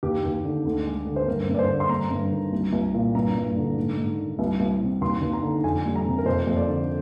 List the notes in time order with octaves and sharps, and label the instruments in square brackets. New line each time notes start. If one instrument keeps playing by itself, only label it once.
[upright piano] D#2 G4
D#2
D3
D2
G#3
D3
C5
G2 A#4
G2
D5
C5
D3
C6
G2 A#5
G2
D#3
C2
C2
A#2
G2 A#5
G2
D3
G#2
G#2
D#3
C2
C2
C3
D#2 C6
D#2
A#5
D3
F2 G#5
G3
A#5
C3
A#4
F2 C5
F2
D5
D3